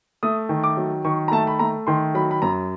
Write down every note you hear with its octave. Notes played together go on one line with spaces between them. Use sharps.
A3 D#6
D#3
D6
F#3
D#3 C#6
A#5
A3 A5
B5
A3 A#5
D#3 C6
F#3 B5
B5
F#2 A#5